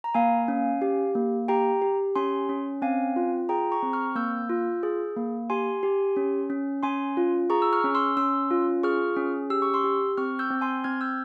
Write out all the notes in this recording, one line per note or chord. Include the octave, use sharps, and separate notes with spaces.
A#5
A#3 F5 G#5
C#4
G4
A#3
G4 G5 A#5
G4
C#4 G#5 C6
C#4
C4 F5 G#5
F4
G#4 G5 A#5
A#5 C#6
C4
C#6 F6
A#3 E6 G6
F4
G#4
A#3
G4 G#5 C6
G4
C#4
C#4
C#4 G#5 C6
F4
G#4 A#5 C#6
E6
C#6 F6
C#4
C6 E6
C#4 C6 E6
F4
G#4 C#6 F6
C#4
G4 E6
C#6
C6 E6
G4
C4 C#6 F6
E6 G6
C4
G#5 C6
C4 F6 G#6
E6 G6